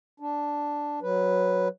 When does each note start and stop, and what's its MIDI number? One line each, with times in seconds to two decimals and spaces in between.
0.20 1.00 62
1.02 1.68 54
1.02 1.68 71